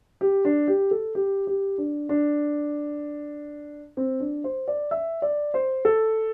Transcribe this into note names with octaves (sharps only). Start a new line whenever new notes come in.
G4
D4
G4
A4
G4
G4
D4
D4
C4
D4
C5
D5
E5
D5
C5
A4